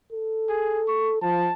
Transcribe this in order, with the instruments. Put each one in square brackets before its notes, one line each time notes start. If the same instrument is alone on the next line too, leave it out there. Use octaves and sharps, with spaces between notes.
[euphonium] A4
[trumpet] G#4
C#6
[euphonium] F3 [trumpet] A5